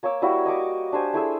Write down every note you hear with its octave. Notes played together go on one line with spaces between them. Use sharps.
A#3 C#5 D6 E6
G3 A#3 E4 F#4
D#5 C#6 D6
D4 G4 C5 G#5
A3 E4 G#4 E6